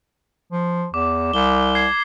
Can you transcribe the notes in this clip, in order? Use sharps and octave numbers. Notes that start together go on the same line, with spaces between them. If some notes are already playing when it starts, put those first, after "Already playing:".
F3
E2 D6
C2 G7
G#6 C7